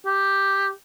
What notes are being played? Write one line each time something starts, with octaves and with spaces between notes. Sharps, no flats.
G4